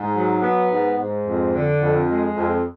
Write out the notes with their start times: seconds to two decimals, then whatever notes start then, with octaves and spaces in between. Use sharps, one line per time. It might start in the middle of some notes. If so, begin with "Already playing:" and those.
Already playing: G#2
0.15 F#3
0.42 B3
0.70 G#2
0.98 G#2
1.25 F2
1.54 D3
1.81 F2
2.09 G#3
2.36 F2